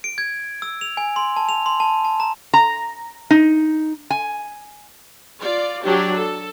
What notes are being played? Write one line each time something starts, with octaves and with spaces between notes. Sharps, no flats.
D7
G#6
E6
F7
G#5
C6
A5
F7
C6
A5
A5
A#5
A#5
D#4
G#5
F4 D5
F#3 D4 G4
A4